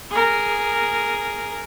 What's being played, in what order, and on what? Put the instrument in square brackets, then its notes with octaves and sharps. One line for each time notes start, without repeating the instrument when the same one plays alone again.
[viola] G#4 A#4